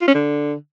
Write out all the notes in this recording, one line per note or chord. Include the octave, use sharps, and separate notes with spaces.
F4
C#4
D3